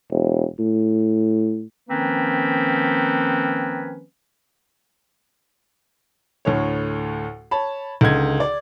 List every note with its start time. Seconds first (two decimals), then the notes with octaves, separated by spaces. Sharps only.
0.10 E1
0.59 A2
1.90 D#3 F3 A#3 C4 C#4 B4
6.45 D2 A2 C#5
7.51 C#5 A5 B5
8.01 C#2 D3 D#4 G#6
8.40 D5